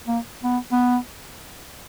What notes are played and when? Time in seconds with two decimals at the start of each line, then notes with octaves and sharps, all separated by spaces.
0.08 A#3
0.43 B3
0.72 B3